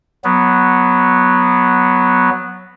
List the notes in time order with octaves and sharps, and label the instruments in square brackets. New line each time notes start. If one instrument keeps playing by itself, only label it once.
[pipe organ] F#3 B3